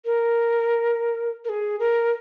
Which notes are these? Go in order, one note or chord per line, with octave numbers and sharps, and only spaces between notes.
A#4
A#4
G#4
A#4